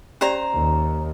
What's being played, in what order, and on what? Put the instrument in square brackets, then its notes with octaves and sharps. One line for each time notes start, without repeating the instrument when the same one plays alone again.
[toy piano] C#4 G4 D5 [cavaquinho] C5 A#5
[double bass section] D#2